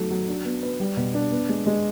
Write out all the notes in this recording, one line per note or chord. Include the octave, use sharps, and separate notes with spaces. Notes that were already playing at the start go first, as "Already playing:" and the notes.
Already playing: F#3 A3 D#4
F#3
D4
B3
B4
G3
B2
D4
B3
G#3
G#3